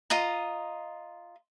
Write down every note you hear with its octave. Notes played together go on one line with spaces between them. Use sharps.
F4 D#5 A#5